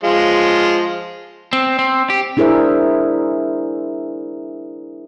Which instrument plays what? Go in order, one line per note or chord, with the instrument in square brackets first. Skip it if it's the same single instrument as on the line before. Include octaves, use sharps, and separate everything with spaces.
[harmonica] F3 G#3 F4
[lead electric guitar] C4
C4
G4
[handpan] D4 E4 G#4 A#4 C5 E5